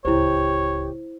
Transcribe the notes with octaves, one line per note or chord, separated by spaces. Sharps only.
D1 C#2 E4 G4 C5 C#5